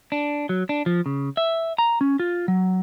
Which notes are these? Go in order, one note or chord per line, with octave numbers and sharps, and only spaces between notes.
D4
F#3
D4
F3
C#3
E5
A#5
C#4
F4
F#3